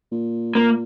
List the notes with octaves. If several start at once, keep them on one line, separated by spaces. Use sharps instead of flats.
A#2
A#2 A#3